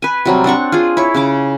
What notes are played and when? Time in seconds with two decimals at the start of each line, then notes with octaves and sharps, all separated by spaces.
0.02 B4 G#5
0.25 C3 F#3 G3
0.44 C4 D4 F#5 C#6
0.72 F4 G#4
0.97 E4 C#5
1.14 C#3 C#5 D6